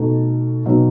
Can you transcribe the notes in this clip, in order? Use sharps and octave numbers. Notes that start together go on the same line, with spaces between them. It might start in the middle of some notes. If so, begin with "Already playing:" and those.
Already playing: B2 A3 D#4 A4
B1 B2 F#3 B3